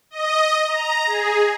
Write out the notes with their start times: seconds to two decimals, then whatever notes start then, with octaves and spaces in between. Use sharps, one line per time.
0.11 D#5
0.67 A#5
1.06 G#4